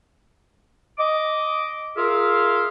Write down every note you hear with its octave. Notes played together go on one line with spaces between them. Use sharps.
D#5 D6
F4 G#4 A#4 E5 F5